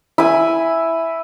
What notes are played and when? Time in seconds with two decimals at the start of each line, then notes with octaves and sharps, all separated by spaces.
0.18 E4 G#5